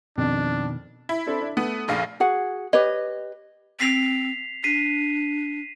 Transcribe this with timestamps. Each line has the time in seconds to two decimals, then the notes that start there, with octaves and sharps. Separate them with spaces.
0.18 F2 B2 D#3 D4
1.09 E4
1.27 C4 D4 A4
1.41 D4
1.57 A3 B3
1.88 F1 A#1 G#4 F5
2.20 F#4 G#4 F#5
2.73 G4 B4 C#5 D#5
3.80 C4 B6 C7 F7
4.64 D4 B6 C7 D#7